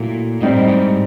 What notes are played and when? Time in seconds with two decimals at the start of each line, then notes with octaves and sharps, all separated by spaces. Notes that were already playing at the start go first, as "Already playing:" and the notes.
Already playing: A#2 F#3 A3 E4
0.41 A2 G3 C4 D#4
0.56 G2
0.68 G#2